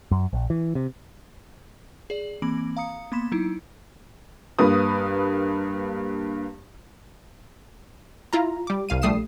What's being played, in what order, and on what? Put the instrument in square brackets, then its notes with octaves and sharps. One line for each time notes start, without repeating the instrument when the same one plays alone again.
[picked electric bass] F#2
A#1
E3
C3
[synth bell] G#4 D5
E3 A#3 C4 B5 D7 F#7
F5 A#5 D#6 C#7
A#3 B3 B5 C6 B6 E7
F#3 D#4 E4
[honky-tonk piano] G2 A#3 B4 D#6
[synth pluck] E4 F4 A#5
G3 D6
C2 F5 D#7
A#1 G3 A3 D#6 C7 E7